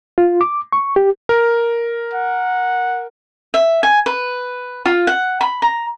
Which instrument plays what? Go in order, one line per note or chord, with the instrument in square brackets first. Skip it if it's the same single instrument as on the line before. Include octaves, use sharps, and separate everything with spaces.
[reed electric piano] F4
D6
C#6
G4
[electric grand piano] A#4
[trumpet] F#5
[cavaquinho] E5
G#5
B4
F4
F#5
B5
A#5